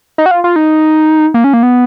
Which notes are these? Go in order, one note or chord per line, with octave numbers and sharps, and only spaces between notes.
D#4
F#4
F4
F4
D#4
A#3
C#4
A#3
B3